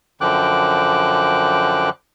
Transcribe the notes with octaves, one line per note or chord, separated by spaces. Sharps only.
F#2 D3 F3 G5 D6 F#6